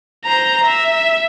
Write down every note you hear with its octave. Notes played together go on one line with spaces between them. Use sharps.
C5 A#5
E5